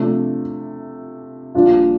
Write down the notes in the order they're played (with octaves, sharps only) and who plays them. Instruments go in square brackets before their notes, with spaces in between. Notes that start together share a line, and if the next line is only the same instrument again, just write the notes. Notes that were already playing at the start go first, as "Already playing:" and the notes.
Already playing: [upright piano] C3 F3 A3 D4
A#1 A#2 G3 D4 F4